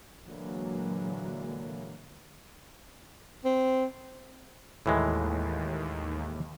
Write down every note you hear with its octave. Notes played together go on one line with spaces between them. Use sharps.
A#2 D3 E3 F#3 G#3 A#3
C4
D#2 A2 E3 G#3